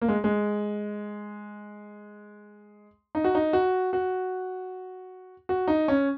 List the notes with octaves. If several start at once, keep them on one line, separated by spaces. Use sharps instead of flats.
A#3
G#3
G#3
D#4
F#4
D#4
F#4
F#4
F#4
D#4
C#4